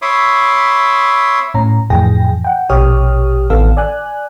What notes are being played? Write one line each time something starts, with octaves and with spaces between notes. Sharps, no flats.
C#5 E5 B5 C6 D6 D#6
A2 C#4 A#5
F2 A2 E3 G#4 G5 A#6
F#5 G5
A#1 B2 G4 C#5 D#6 F6
A1 D#3 B3 A4 F5 E6
D5 G#5 F#6